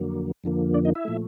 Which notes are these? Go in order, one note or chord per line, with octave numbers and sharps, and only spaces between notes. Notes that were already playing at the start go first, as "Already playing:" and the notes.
Already playing: F2 D3 F#3 A#3
F2 D3 F3 A#3
D4 D5
D#4 D#5
E4 E5
A#2 F3 A3